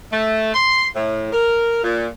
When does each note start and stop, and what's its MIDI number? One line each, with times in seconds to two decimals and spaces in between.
0.11 0.53 57
0.54 0.88 84
0.95 1.29 45
1.33 1.83 70
1.84 2.07 46